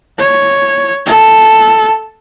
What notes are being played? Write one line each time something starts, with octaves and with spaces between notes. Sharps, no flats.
C#5
A4